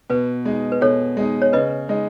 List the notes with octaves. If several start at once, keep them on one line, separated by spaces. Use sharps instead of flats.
B2 B4
G#3 D#4
B4
B2 A4 C#5
G#3 D#4
C#5
C#3 B4 D#5
G#3 D#4